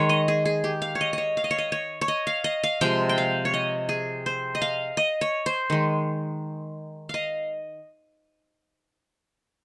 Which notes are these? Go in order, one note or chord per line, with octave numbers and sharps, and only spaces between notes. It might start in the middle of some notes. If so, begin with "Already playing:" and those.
Already playing: D#3 G#3 C#5
D#5
G#4
G#4
G4
F5
C#5
D#5
C#5 D#5
F5
D#5
C#5
D#5
C#5
C#5
D#5
F5
D#5
F5
C3 F3 G#3 G5
G5
F5
C#5
D#5
G#4
C5
D#5
F5
D#5
C#5
C5
D#3 G#3
D#5 F5